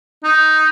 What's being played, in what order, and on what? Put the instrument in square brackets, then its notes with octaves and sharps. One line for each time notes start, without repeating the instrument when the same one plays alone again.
[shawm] D#4